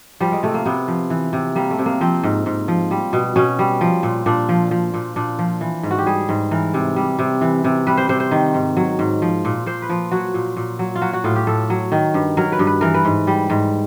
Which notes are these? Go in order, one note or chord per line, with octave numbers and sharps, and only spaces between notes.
F3 G3
G#3
C3 A3
A#3
C3 B3
F3
E3
C3
G3 A#3
A3
C3
A#3
F3 C4
G#2
G#2
F3
G3
B2
B2 C#4
G3
F3
A#2
A#2 D4
F3
F3
A#2
A#2 D4
F3
E3
G#2
F#4
G4
G3 G#4
G#2
E3 A#4
C3
G3
C3
E3
C3
G3 B4
C5
C3 C5
C5
D#3
G#2
F#3
G#2
F3
A#2
A#2 C5
B4
F3
F#3 F#4
A#2
A#2
F#3
F4
F#3 F#4
F#4
A2 F4
G4
A2 A4
F#3
D#3
G2
F#3 A#4
B4
G2
B4
E3 A#4
B4
G#2
G3
G#2